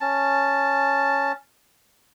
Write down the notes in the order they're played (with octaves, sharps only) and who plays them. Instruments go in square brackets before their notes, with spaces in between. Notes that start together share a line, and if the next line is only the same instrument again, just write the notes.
[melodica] C#4 A5